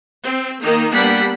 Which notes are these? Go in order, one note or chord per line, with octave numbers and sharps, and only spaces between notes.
C4
D#3 A#3 D#4
G3 A#3 B3 D4 F#5 B5